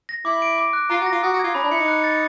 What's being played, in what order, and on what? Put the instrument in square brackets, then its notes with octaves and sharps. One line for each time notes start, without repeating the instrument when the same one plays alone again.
[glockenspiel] A#6
[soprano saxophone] E4 [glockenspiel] D6
[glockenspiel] D7
D6
F#6
[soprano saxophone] F4 [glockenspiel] A#5
[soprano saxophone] F#4
[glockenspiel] A#6
[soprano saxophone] F4
[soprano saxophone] F#4 [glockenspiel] D#6
[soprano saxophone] F#4
[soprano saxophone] F4 [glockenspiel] G#6
[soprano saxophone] C#4 [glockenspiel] B5
[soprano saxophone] D4
[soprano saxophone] E4 [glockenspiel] C#7
[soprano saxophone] D#4
[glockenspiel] F#6
A6